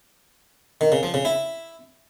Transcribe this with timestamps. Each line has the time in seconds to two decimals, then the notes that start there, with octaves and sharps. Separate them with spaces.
0.81 D#3
0.92 C#3
1.03 F3
1.14 C#3
1.25 E4